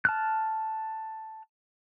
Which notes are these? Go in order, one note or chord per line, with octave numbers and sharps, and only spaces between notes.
A5 F6 F#6